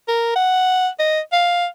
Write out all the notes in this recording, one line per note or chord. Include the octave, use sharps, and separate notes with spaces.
A#4
F#5
D#5
F5